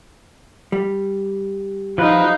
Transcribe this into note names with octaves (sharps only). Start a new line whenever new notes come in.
G3
F3 D#4 B4 F5